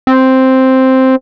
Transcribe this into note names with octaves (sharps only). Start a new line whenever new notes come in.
C4